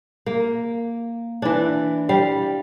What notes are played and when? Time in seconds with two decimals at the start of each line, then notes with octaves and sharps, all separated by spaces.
0.26 A#3
1.42 E3 D4
2.09 G3 F5